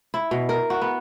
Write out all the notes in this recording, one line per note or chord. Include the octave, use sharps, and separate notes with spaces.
E4
B2
A#4
F#4
B3